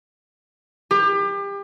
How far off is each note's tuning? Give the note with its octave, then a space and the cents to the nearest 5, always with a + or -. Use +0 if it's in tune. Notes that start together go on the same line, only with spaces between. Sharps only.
G4 +30